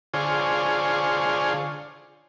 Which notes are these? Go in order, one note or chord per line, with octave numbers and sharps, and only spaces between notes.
D3 F4 G#4 C5 C#5